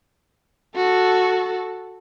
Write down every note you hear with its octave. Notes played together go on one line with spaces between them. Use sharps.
F#4 A4